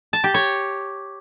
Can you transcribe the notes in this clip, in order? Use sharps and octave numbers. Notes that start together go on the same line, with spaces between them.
A5
G4
C#5